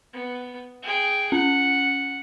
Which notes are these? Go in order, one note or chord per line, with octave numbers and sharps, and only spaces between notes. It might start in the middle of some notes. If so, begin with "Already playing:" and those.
B3
G#4 G5
C#4 F#5